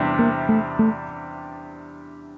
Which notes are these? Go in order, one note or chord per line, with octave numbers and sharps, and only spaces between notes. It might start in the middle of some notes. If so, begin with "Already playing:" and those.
Already playing: E2 C3 G3 D4
A#3
A3
A3